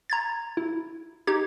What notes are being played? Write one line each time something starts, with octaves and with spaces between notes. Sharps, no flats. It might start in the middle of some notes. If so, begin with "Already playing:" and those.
A#5 G#6 A6
E4
D#4 G4 G#6